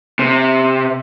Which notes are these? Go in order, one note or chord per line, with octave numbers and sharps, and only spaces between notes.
C3